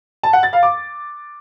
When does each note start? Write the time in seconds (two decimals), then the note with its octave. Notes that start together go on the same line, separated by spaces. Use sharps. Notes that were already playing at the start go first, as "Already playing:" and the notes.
0.23 A5
0.33 F#5
0.43 A6
0.53 F5
0.63 D6